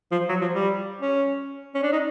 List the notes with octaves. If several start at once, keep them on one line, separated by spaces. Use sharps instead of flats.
F3
F#3
F3
G3
C#4
C#4
D4
D#4